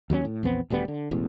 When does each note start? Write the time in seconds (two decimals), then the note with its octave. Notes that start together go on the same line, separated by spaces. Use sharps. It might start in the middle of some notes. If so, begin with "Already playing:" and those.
0.10 D#2 F#3 G3 C#4
0.25 A2
0.43 A#1 E2 B3 C4
0.70 D#1 D2 G3 B3
0.88 D3
1.11 E1 A1 E2